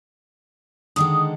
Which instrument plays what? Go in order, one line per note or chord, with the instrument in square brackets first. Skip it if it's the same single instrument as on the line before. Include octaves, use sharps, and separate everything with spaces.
[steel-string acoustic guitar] D3 D#3 G#3 [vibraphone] D#6